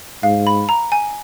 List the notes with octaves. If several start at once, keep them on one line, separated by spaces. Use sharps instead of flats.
G#2 F5
B5
A#5
G#5